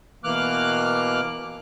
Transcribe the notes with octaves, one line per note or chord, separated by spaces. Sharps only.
B2 E3 A#3 D6 F6 F#6